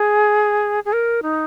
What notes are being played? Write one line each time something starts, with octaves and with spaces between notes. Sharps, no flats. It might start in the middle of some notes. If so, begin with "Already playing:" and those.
Already playing: G#4
G#4
A#4
D#4